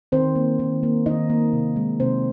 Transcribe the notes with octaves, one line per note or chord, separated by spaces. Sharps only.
D#3 C4 C5
A#3
D#3
A#3
D#3 D#4 D#5
A#3
C3
G#3
C3 C4 C5